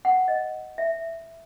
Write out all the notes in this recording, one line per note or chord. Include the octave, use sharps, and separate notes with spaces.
F#5
D#5
E5